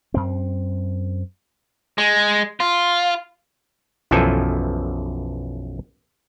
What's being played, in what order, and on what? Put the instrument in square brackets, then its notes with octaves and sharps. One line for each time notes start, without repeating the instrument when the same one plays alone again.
[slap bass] F#2 C4
[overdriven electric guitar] G#3
F4
[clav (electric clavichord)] B1 F#2 E3 F3 A4 G#5